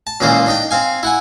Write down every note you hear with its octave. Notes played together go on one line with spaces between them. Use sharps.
A5
C#2 A#2 C#3 E3 A#3 C5
D4 D#4 G5
C4 F5 G#5
E4 F#5 G#5